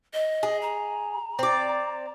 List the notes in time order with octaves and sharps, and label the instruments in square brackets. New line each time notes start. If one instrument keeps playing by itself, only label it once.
[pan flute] D#5
[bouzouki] G#4
[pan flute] A#5
[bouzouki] C4 D5